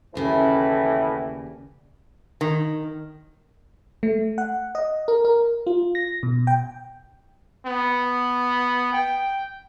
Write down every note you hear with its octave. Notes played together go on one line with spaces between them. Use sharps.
D#2 A2 C#3 E3 D5
D#3
A3
F#5
D#5
A#4
A#4
F4
A#6
B2
G5
B3
G5